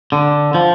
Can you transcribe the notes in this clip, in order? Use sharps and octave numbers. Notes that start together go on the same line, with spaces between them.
D3
F3